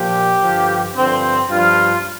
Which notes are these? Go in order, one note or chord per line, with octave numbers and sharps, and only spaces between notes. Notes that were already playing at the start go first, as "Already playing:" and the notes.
Already playing: A#2 F3 G4
G2 D3 F3
G2 D3 F3 C4
G2 F3 F4